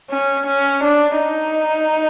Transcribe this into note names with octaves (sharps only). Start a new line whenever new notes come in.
C#4
C#4
D4
D#4